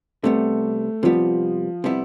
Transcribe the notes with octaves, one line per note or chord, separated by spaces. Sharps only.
C3 G3 A3 B3
C3 F3 G3 B3
C3 G3 B3 E4